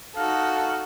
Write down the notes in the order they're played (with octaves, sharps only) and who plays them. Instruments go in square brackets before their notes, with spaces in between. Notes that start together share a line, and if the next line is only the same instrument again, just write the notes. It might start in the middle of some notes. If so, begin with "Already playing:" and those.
[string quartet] D#4 F#4 A4 [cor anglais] F5